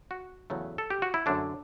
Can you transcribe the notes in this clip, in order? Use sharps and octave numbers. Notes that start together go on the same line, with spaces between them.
F#4
E2 C#3 F#3 A3
A4
G4
F#4
E4
F#2 D3 A3 D4